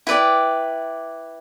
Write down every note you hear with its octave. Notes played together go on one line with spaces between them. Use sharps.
E4 B4 D5 G5